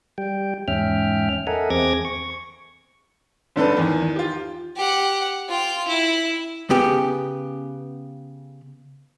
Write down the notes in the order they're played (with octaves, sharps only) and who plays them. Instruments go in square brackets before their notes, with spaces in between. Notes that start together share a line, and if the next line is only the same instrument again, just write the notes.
[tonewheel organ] G3 G5
E2 G#2 C#4 E5 G5 F6
A4 A#4 D#5 E5 F#5 G#5
E2 C4 G#4 D6 G#6 A#6
C#6
[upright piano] G1 D3 A4 B4
E2 D#3
F4 G4
[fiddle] G4 F#5
F4 G5
E4
[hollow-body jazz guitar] C#3 B3 G4